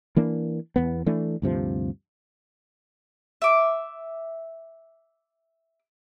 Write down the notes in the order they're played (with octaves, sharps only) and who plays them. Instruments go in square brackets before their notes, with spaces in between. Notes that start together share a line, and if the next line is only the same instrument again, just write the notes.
[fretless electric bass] E3 A#3 D4
E2 B3
E3 A3 D4
D2 G2 C3 F3
[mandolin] E5 D6